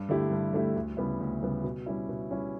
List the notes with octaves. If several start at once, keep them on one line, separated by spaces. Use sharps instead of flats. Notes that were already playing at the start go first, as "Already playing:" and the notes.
Already playing: G2
D3 A3 E4 G4
G2
D3 A3 E4 G4
D2
C#3 G3 B3 E4
D2
C#3 G3 B3 E4
B2
G3 C#4 E4
B2
G3 C#4 E4